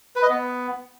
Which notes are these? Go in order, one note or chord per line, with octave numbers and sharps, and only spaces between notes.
B4
D#5
B3